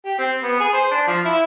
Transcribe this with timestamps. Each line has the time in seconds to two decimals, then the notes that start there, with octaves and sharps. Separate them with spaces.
0.05 G4
0.19 C4
0.43 B3
0.60 G#4
0.73 C5
0.91 D4
1.07 F3
1.25 E4